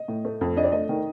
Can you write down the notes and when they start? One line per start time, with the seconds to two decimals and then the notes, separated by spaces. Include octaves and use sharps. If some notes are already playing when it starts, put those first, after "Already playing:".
Already playing: D#5
0.08 A2
0.25 A3
0.41 F2
0.56 D4 D#5
0.64 D5
0.72 A3 D#5
0.89 D#3